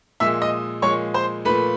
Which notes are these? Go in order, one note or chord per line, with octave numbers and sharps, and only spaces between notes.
A#2 F3 G#3 E5 E6
D#5 D#6
A#2 F3 G#3 C#5 C#6
C5 C6
A#2 F3 A3 B4 B5